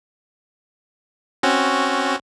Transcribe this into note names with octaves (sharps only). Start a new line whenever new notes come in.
C4 C#4 F#4